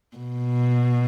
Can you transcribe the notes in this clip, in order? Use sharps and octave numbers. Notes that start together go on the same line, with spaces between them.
B2